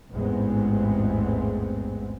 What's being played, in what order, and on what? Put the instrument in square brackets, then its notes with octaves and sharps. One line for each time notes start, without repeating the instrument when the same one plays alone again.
[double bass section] A1 E2 G#2 G#3 B3 C4